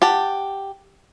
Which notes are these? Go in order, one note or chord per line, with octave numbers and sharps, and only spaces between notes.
G4 F#5 A5